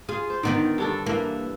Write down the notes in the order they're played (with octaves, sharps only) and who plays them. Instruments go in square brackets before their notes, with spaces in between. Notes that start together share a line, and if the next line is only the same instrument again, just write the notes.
[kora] F4 [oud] G#4
[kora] C5
[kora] D3 D5 [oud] D#3 B3 D#4
[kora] G2 D4 A4
[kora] E3 E5 [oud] A#3